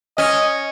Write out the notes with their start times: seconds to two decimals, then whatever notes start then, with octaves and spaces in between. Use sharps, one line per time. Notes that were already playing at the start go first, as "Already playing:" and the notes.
0.17 C#4 D#5